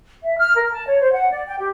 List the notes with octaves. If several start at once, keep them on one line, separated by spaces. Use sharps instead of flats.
E5
F6
A#4
A5
C#5
C5
F#5
D5
G5
G4